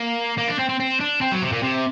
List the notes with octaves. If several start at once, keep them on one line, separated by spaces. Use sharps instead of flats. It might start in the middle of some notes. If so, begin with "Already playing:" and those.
Already playing: A#3
A#3
D4
C4
C4
C4
D4
C4
F#3
C3
A#2
C3